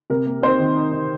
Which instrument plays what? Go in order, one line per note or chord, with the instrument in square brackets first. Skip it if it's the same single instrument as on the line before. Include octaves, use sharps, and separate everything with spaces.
[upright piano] C3 A#4
A#3
C4 D#4 C5
D#3
D#4
D#4